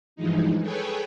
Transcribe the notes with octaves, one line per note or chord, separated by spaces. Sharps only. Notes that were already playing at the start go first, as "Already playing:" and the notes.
G2 E3 F3 G#3 D#4
G#4 A4 B4 C#5 G5 G#5